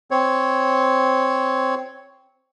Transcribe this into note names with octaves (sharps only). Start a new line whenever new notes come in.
C4 C#5